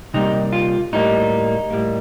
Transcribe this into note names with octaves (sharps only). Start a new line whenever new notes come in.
C3 G3 A#3 D#4
F4
A2 G3 A#3 D#4
A2 G3 A#3